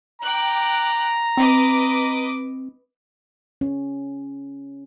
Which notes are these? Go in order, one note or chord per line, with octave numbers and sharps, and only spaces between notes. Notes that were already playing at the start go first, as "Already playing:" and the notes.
G5 A#5 D6 F#6
C4 B4 D#5 D6
C#4